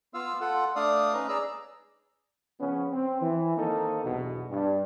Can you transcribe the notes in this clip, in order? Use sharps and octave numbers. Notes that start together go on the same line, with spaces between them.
B3 F4 F5 E6
F4 A4 F#5
A3 D4 D5 F5 D#6
C#4 D#4 B4 A#5
G#4 D5 A#5 E6
C#3 F3 B3 C#4
C4
E3
D#3 A#3 C4 D#4 A4
B1 E2 G2 B2
G2